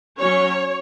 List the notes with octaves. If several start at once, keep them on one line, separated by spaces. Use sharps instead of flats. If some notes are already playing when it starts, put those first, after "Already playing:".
F#3 C#4 C#5